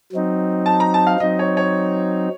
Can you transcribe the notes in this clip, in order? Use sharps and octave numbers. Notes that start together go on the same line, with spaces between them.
F#3 C4 D#4
A5
A#5
A5
F5
F#3 C4 D#4 D#5
C#5
C#5